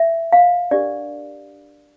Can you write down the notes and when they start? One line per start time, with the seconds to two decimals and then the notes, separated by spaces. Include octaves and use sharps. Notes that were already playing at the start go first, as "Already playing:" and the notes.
Already playing: E5
0.33 F5
0.71 D4 G4 A#4 D5